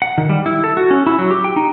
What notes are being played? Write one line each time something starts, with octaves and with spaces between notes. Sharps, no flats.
F#5
D#3
G3
E4
A4
F#4
C#4
E4
F#3
G4
G5
D#4